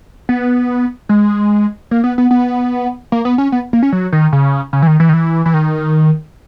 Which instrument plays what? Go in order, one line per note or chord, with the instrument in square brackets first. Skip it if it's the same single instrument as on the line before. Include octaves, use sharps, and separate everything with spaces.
[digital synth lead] B3
G#3
A#3
B3
B3
B3
A#3
B3
C#4
B3
A#3
C#4
F#3
D#3
C#3
C#3
E3
D#3
E3
D#3
E3
E3
D#3